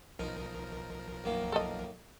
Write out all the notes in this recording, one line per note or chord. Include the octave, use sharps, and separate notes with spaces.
B1 F3 D#4 A#4
F#2 D#3 A#3
A4 D#5